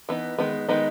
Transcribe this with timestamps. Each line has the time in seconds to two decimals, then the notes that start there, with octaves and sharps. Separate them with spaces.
0.09 E3 B3 D#4
0.39 D#3 G#3 B3
0.69 D#3 G#3 B3 D#4